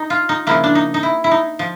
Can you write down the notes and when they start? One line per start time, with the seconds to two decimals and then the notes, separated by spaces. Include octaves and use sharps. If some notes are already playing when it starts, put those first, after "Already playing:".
Already playing: D#4
0.10 F4
0.29 D#4
0.47 C#3 F3 A#3 E4
0.64 D4
0.75 D#4
0.94 D#4
1.03 E4
1.24 E4
1.31 D#4
1.59 F3